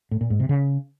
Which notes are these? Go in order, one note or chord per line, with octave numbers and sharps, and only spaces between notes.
A2
A#2
G#2
C3
C#3